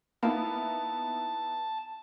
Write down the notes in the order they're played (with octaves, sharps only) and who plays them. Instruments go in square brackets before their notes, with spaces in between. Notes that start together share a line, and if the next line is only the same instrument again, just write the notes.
[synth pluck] A#3 [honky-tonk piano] B3 D#4 E4 [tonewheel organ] A5